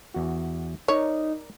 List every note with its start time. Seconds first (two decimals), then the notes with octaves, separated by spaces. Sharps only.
0.14 E2 F#4
0.88 D#4 A#4 C#5 D5